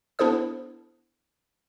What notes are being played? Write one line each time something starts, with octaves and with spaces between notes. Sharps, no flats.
B3 D4 E4 A4 C5 D#6